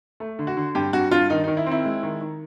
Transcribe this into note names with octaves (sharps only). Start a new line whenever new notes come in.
A3
D3
F#4
D3
G2 G4
G2 F#4
G2 F4
D#3 D#4
D#3 D#4
E4
C4
E4
G#3
D#3
D#3